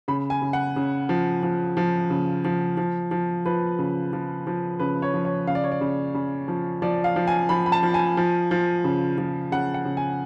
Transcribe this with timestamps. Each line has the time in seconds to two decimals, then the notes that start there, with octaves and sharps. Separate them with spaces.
0.08 C#3 B5
0.30 G#5
0.42 C#3
0.53 F#5
0.76 C#3
1.09 F3
1.43 F3
1.77 F3
2.10 C#3
2.45 F3
2.77 F3
3.11 F3
3.46 F3 B4
3.79 C#3
4.13 F3
4.47 F3
4.79 C#3 B4
5.02 C#5
5.14 F3
5.25 C#5
5.47 C#3 F5
5.55 D5
5.64 C#5
5.72 D5
5.81 C#3
6.14 C#3
6.48 F3
6.82 F3 D5
7.04 F5
7.16 F3
7.27 G#5
7.49 F3 B5
7.66 B5
7.72 A5
7.83 F3
7.94 G#5
8.17 F3
8.51 F3
8.84 C#3
9.18 F3
9.52 C#3 F#5
9.74 F#5
9.85 C#3
9.97 G#5